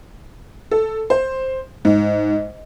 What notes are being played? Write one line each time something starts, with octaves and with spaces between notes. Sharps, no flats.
A4
C5
G#2